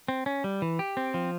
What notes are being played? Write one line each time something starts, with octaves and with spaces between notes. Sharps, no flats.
C4
C#4
G3
E3
G4
C4
F3